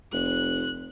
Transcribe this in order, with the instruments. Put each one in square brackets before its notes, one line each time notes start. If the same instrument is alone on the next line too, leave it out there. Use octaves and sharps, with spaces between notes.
[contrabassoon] F1 [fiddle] F#6